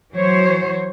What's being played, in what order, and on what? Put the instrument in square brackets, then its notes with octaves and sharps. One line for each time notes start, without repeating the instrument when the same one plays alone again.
[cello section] E3 F#3 C5 C#5